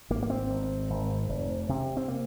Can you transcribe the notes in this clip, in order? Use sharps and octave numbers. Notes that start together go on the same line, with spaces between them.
G#1 A#3
A#3
C4
G#1
G#1
F1
C3
C4
A#3